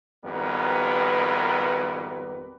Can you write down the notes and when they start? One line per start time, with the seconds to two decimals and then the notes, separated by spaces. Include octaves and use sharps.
0.24 G#1 F2 G3 B3 A#4 B4